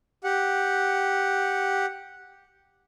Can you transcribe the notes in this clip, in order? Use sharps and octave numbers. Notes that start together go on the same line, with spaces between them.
G4 F#5